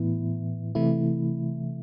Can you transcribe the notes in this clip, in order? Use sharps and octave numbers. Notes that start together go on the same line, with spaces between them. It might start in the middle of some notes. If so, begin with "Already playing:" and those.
Already playing: A2 E3 B3 E4
C3 E3 A3 E4